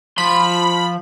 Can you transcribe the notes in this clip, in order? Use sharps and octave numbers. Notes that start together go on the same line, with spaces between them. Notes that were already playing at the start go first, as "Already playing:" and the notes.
F3 B5 C6